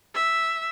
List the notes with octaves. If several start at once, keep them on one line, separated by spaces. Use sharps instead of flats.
E5